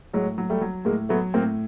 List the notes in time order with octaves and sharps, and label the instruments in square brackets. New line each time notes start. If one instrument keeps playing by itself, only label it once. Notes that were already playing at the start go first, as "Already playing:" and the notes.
[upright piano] A2 [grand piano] F#3 G#3
[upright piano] F#3
[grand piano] G3 A3
[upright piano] F#3
[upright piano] A2 [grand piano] G#3 A#3
[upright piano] F#3 [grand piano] A3 B3
[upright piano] A2 [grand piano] A#3 C4